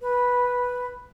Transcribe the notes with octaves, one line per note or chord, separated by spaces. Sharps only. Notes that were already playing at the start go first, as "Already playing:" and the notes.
B4